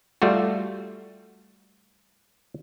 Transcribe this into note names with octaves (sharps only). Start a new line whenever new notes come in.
G3 A3 F4 F#4